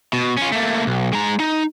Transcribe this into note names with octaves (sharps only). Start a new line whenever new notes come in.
B2
C#4 F4
A3 A#3
B1
G#3 A#5
D#4